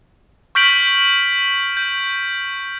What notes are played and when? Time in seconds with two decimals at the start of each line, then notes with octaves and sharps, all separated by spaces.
0.55 C#6 F6 G6 B6 D7 F#7
1.77 G6